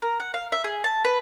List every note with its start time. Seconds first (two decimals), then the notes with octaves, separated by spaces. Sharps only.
0.02 A#4
0.20 F#5
0.34 F5
0.52 E5
0.64 G#4
0.84 A5
1.05 B4